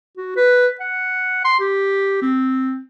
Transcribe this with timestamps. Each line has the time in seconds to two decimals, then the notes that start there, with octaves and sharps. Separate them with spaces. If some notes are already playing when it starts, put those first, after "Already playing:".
0.17 F#4
0.36 B4
0.80 F#5
1.45 C6
1.60 G4
2.22 C4